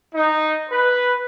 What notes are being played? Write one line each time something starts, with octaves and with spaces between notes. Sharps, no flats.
D#4
B4